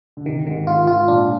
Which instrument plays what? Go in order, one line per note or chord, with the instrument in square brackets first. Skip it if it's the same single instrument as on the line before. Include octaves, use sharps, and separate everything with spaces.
[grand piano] D3
[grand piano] C3 [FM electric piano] D#3
[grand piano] G#2 [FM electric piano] D#3
[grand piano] G#2 [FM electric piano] F4
[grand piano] G#2 [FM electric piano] F4
[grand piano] A#2 [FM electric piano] D4